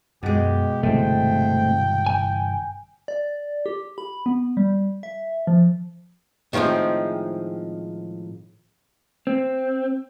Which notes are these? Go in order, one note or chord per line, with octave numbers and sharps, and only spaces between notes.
F#2 B2 G#3 G4
G1 C3 E3 A3 C4 G5
G#5
D5
G4
B5
B3
G3
E5
F3
A2 D#3 F3 G#3 C4
C4